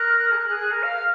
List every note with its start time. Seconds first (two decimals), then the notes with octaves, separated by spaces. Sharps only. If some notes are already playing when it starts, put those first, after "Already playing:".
Already playing: A#4 F#6
0.31 G#4
0.36 A#4
0.48 G#4
0.59 G#4
0.71 A#4
0.83 F5 F6
0.99 F5